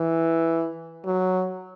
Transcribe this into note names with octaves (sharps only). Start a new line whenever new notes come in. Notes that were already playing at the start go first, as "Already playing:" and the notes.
Already playing: E3
F#3